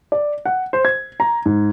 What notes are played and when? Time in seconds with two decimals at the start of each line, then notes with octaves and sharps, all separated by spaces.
0.12 D5
0.45 F#5
0.73 C5
0.85 G#6
1.20 A#5
1.46 G#2